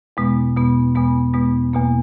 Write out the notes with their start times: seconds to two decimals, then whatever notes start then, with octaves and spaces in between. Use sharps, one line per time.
0.17 E2 B2 G#3 B3
0.57 E2 B2 G#3 B3
0.95 E2 B2 G#3 B3
1.34 E2 B2 G#3 B3
1.73 E2 B2 A#3